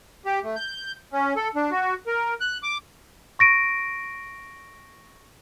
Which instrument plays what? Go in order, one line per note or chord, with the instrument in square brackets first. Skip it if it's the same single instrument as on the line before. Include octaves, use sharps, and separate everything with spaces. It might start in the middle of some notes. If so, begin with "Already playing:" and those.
[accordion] G4
A3
G6
C#4
A4
D4
F#4
A#4
F#6
D6
[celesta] C#6 A#6 D7 D#7